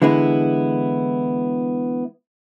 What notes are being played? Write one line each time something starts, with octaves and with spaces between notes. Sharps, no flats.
D3 E3 G#3 B3 E4